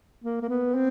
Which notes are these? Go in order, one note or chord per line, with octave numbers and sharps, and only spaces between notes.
A#3
A#3
B3
C4